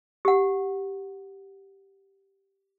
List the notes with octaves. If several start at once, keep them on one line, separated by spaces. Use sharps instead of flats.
G4 F#5